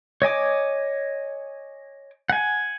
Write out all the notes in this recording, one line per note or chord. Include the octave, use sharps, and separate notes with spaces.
C#5 D#5 G#5 D6
F#5 G#5